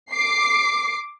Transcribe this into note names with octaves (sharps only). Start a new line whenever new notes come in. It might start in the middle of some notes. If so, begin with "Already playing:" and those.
D6 C7